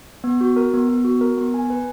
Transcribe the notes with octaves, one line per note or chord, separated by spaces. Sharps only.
B3
F#4
A#4
B3
B3
F#4
A#4
B3
G#5
B4